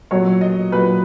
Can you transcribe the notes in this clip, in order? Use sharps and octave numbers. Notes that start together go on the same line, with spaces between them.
A#2 F#3 C#5
D#5
A#2 F#3 B4